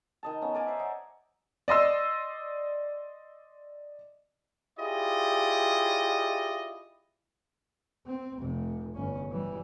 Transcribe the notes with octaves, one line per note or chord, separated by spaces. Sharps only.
D#3 D#5 A5
B3 C#4
A#4 D5 G#5
C5 E5
C5 D#5 F#5
D5 D#5 C6 E6
E4 F4 G4 G#4 D5 D#5
C4
F1 C3
G1 C#4
E3 G3